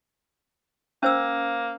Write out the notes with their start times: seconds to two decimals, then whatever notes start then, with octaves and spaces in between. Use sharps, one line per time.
1.03 A#3 C#4 C5 E6